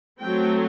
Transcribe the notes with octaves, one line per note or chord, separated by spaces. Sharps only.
F#3 A3 C4 G5